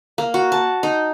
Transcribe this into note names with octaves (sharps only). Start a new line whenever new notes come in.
A#3
F#4
A5
D#4